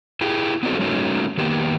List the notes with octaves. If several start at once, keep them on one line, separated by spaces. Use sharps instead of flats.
E4 G4 G#4
B3 C4 D#4 F4 F#4 A4
G3 A3 A#3 C#4 D#4 F#4
D#3 A#3 B3 G4